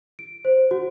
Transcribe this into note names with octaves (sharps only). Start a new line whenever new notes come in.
D7
C5
F#4